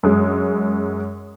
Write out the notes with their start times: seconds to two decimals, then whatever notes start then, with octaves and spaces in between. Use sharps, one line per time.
0.03 F#2 G#3